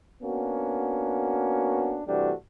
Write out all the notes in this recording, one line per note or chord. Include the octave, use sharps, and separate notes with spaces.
A#3 B3 C#4 D4 F#4
C3 E3 G3 A3 D4 F#4